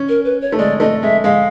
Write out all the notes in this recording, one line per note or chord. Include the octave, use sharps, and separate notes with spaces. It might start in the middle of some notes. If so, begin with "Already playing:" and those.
Already playing: C#4
A#4
B4
C#5
A3
G#3 D5
A3 D#5
G#3 E5
G#3 F5